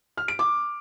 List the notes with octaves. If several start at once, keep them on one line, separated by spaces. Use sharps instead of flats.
F6
D7
D6